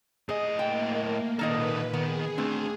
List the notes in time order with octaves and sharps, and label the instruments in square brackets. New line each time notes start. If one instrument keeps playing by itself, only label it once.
[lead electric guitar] A2 D#5 [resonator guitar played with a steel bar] G#4
[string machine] A#3 [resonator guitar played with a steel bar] G5
[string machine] A#2 B4 [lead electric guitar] D#3 A4 [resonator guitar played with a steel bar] A#3 D#4 D#5
[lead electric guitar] D#3 [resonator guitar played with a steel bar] B3 [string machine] G#4
[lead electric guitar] A3 D4 [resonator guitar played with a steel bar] C4